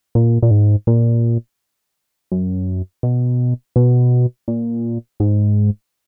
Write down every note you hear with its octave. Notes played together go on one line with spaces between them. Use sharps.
A#2
A#2
G#2
A#2
F#2
B2
B2
A#2
G#2